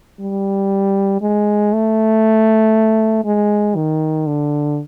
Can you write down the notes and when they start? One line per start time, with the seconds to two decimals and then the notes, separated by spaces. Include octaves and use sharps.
0.20 G3
1.22 G#3
1.73 A3
3.25 G#3
3.76 D#3
4.27 D3